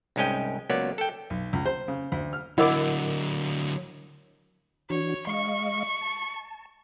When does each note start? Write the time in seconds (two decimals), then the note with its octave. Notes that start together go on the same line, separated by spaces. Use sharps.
0.16 C2 G#2 G#3 C#4 D#5 G5
0.69 C#2 F#3 A#3 B3 C#5 D5
0.98 A4 G5
1.30 B1
1.53 C#2
1.66 C5
1.88 C#3
2.12 D2
2.33 F6
2.58 D3 F#3 E4 A#4 D#5 F#5 D6
4.90 E3 D4 F#4 C#5
5.27 G#3 D#5 F5 C#6
6.01 A5